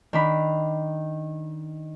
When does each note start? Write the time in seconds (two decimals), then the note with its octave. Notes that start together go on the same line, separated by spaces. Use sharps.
0.13 D#3 D4 B5